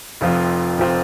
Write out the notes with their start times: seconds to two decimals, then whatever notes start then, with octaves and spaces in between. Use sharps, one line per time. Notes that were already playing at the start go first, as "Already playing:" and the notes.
0.21 F1 F2 F3 C4 F4
0.78 F1 F3 C4 F4